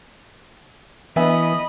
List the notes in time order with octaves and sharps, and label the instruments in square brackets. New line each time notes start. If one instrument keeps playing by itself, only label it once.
[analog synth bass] E3 [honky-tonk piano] B3 E5 G#5 [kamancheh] D#5 B5